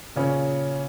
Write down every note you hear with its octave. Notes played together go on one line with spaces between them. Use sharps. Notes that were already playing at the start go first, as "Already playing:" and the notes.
A#2 C#3 C#4